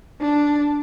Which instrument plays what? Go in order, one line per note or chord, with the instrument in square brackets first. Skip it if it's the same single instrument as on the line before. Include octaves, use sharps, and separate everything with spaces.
[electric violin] D4